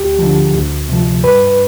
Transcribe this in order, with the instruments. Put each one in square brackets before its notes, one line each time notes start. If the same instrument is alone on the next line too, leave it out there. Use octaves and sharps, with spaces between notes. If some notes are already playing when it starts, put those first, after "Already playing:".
Already playing: [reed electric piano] D2 G4
D3 F3
D2
C3 F3
G2 B4